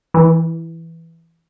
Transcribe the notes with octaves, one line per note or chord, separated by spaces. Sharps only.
E3